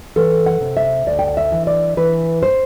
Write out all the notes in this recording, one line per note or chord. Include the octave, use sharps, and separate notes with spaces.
E3 A4
F#5
C3
E5
D2 D5
G5
F#5
E5
E3
D5
E3 B4
C5